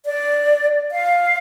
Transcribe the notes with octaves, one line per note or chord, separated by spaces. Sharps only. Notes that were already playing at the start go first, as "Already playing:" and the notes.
D5
F5